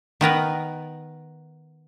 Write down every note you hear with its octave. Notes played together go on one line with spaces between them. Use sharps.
D#3 B3 A#4 B4